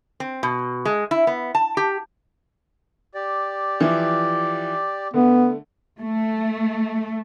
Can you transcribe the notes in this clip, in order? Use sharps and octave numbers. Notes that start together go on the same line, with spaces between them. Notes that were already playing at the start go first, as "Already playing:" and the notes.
C4
B2
G#3
E4
B3
A5
G4
G4 D5
E3 F3 E4
D3 A3 B3
A3